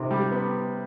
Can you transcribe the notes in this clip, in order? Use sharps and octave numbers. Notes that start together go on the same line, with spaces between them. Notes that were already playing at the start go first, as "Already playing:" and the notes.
Already playing: C3 D#3
G3
B3